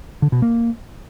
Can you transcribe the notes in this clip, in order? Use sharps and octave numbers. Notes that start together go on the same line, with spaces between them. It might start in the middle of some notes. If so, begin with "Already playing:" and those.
D3
B2
A#3